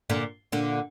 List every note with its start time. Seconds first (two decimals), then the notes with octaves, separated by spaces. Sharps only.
0.10 A#2 D3
0.52 A#2 D3